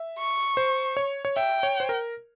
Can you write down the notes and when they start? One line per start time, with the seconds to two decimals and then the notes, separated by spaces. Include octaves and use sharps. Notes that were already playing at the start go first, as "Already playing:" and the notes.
Already playing: E5
0.19 C#6
0.57 C5
0.97 C#5
1.25 C#5
1.36 E5 G5
1.63 C#5
1.80 C5
1.89 A#4